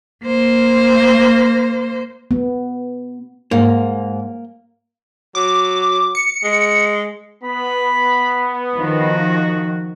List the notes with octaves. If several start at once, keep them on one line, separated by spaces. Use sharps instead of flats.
A#3 C5
B3
G#2 A#3
F#3 D6
C#7
G#3
B3 B5
D#3 F3 F#4